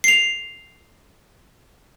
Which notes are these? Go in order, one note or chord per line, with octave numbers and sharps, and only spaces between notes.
C7 F7